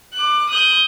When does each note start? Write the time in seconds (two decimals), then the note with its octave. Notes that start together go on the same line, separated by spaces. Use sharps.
0.14 D6 F#6
0.50 D#6 F#6 G6